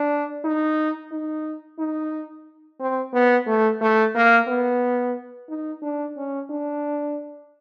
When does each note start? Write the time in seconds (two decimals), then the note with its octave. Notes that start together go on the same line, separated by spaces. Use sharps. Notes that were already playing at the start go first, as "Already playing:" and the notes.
Already playing: D4
0.45 D#4
1.12 D#4
1.79 D#4
2.80 C4
3.13 B3
3.47 A3
3.81 A3
4.15 A#3
4.48 B3
5.49 D#4
5.82 D4
6.17 C#4
6.50 D4